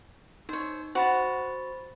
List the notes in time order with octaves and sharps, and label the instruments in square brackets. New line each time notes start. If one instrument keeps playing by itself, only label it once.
[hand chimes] D#4 [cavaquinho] C5 C#5
[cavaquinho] F#4 [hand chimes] C5 B5 A6